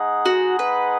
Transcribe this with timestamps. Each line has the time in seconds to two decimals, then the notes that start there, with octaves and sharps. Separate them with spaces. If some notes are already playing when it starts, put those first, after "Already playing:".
Already playing: G#3 D#4 G#4 D#5 F#5
0.26 F#4
0.59 B4